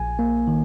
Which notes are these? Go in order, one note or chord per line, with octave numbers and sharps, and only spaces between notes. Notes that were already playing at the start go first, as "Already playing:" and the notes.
Already playing: A#1 G#5
A#3
D#3